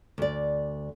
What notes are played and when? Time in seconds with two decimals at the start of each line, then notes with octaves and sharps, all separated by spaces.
0.18 D2 D5